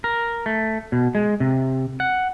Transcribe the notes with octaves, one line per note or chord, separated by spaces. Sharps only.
A#4
A3
B2
G#3
C3
F#5